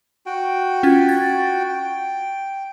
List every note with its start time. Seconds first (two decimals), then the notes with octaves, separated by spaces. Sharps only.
0.26 F#4 G5
0.83 C#4 F4 G#6
1.08 G#6 A6
1.69 G5